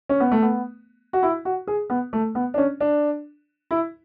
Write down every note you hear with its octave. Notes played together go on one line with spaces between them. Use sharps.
C#4
B3
A3
B3
F#4
E4
F#4
G#4
B3
A3
B3
D4
C#4
D4
E4